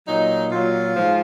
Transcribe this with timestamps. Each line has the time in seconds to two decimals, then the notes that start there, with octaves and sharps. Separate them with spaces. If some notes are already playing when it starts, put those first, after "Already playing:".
0.07 A#2 F#3 D#4
0.50 A#2 F#3 F4
0.94 G#2 F3